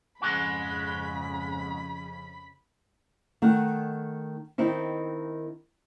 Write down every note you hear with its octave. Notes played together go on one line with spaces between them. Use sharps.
F2 G#2 C#3 G#3 F#4 B5
D#3 A3 F#5
D#3 C4 D#4 E4